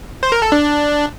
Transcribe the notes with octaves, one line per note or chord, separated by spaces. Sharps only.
C5
A#4
A4
D4